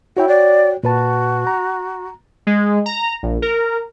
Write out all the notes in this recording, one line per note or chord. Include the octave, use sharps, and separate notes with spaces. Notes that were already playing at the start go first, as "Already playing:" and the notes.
E4 F#4 C#5 G5
D5
A#2 F#4 B4 A5
A#5
G#3
A#5
A#1
A#4